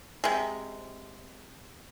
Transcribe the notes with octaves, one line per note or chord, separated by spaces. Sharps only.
C3 G#3